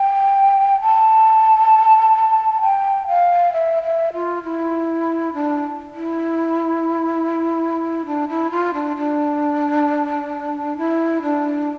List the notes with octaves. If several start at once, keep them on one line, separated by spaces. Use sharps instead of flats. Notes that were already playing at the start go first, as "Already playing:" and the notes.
Already playing: G5
A5
G5
F5
E5
E5
F4
E4
D4
E4
D4
E4
F4
D4
D4
E4
D4